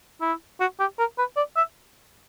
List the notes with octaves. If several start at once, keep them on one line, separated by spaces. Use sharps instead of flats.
E4
F#4
G4
A#4
B4
D5
E5